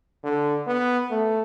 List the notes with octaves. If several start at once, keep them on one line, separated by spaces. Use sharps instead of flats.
D3
B3
A3